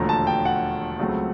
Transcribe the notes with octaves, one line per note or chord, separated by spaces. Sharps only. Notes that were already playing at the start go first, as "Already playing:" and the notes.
Already playing: E1 D#2 D3 F3 A3 A#5
A5
G5
F#5
C#2 C#3 F#3 A3 C4